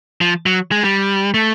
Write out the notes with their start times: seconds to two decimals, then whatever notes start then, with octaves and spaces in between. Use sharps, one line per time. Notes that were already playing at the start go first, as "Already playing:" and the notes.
0.21 F3
0.46 F#3
0.72 G#3
0.84 G3
1.34 A3